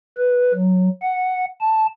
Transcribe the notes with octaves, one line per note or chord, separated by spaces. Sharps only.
B4
F#3
F#5
A5